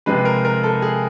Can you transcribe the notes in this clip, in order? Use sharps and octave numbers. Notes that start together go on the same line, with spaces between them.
C3 F3 G#3 B4
A#4
A#4
A4
G#4